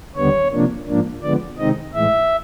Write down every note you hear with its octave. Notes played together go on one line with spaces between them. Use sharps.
D#2 D3 G3 B3 C#5
C3 F3 A#3 D4
G#2 F3 A#3 D4
D3 F3 G#3 B3 D5
C3 D#3 G#3 C4 D#4 D#5
A2 E3 G#3 E5